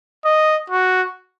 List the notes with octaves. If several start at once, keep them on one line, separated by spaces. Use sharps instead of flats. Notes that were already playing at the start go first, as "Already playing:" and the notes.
D#5
F#4